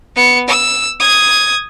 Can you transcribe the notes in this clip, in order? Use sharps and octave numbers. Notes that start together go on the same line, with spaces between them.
B3 C#7
E6
D#6 G#6